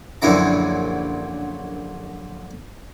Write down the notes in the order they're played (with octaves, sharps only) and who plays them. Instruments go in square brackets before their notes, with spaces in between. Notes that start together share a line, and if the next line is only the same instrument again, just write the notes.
[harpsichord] A#1 F#2 D3 E4 A#5